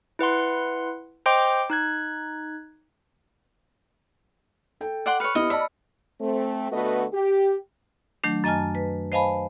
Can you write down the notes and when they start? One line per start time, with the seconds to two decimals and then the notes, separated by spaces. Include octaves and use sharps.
0.19 E4 B4 F#5 C6
1.26 C5 D#5 G5 C6 D6
1.70 D#4 F#6 G#6
4.81 A4 G5
5.06 D5 F#5 C6
5.20 B4 C#5 B5 F6 C#7
5.35 B3 E4 G4 D#5
5.50 D5 D#5 A5 B5 E6
6.21 A3 C4
6.71 D3 A3 B3 F#4 B4 D#5
7.13 G4
8.24 D#3 F#3 A3 D4
8.44 F#2 D#5 G#5 A5 F6
8.75 B4
9.12 C5 D#5 F5 G#5 A5 B5